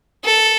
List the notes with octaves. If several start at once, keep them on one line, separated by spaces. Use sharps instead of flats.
A4